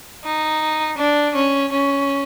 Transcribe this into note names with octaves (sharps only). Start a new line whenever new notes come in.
D#4
D4
C#4
C#4